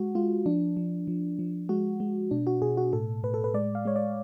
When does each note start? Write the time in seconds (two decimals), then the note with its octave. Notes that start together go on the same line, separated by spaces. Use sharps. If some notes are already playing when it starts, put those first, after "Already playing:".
Already playing: G#3 F#4
0.15 G#3 F4
0.46 F3 D4
0.77 F3
1.07 F3
1.39 F3
1.69 G#3 F#4
2.00 G#3
2.31 B2 D4
2.47 F#4
2.62 B2 G#4
2.77 F#4
2.93 A2 A4
3.23 A2 B4
3.34 A4
3.44 B4
3.54 G#3 D5
3.75 F5
3.85 G#3 C#5
3.96 D5